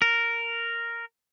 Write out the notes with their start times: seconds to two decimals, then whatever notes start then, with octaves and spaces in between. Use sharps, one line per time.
0.02 A#4